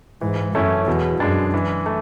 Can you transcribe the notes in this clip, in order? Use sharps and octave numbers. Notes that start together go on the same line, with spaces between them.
G#2 E3
F#2 A3 C#4 E4
E2 B2
F#2 G#3 D4
E3
A3